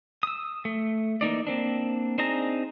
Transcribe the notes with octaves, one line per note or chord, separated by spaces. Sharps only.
D#6 E6
A3
E3 A#3 D#4 D5
A#3 C4 D4
C4 D4 D#4 G#4 A#5